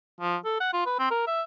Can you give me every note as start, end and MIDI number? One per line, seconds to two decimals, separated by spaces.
0.21 0.37 53
0.45 0.59 69
0.60 0.68 78
0.73 0.85 65
0.86 0.96 71
0.99 1.11 60
1.11 1.26 70
1.27 1.42 76